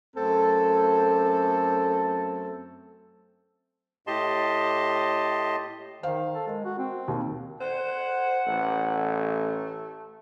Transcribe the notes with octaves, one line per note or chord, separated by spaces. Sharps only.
F#2 A3 C4 A4
A2 G4 D#5 A5 C6
D#3 C5 F5
A4
G#3 A#4
F#4
C4
D#2
C5 F#5
A1 A3